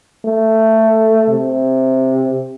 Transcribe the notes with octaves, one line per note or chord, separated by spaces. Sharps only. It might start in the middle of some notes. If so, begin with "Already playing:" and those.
A3
C3